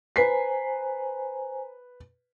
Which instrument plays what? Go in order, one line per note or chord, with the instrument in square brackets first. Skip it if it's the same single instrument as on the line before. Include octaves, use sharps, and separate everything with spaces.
[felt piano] B4 B6 C7 [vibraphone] C5 G#5 A#5